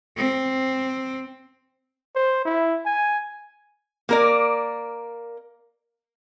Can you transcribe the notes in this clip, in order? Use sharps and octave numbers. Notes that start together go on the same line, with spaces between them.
C4
C5
E4
G#5
A#3 A#4 D5